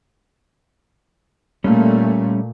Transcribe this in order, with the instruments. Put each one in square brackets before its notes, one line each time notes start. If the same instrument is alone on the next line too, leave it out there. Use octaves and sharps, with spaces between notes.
[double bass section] A#2 A3 [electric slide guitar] G3 C#4